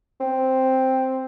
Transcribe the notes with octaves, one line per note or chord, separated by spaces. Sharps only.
C4